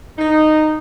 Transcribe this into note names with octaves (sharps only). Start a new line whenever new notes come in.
D#4